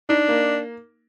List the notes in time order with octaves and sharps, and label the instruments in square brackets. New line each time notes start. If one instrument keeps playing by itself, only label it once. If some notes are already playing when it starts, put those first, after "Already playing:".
[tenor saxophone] D4 [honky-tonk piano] D#4
[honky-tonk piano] A#3